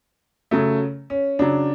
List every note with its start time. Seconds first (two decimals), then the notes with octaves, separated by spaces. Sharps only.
0.51 C#3 F#3 A3
1.10 C#4
1.39 C#3 F#3 D4